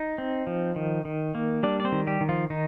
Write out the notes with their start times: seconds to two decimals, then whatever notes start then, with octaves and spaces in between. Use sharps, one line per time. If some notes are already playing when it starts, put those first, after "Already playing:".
Already playing: D#4
0.18 C4
0.47 F3
0.76 D#3
1.05 D#3
1.35 A#3
1.63 G3 D4 D5
1.80 D5
1.85 C4 C5
1.92 D#3
2.07 G3 G4
2.21 D#3
2.29 F3 F4
2.50 D#3 D#4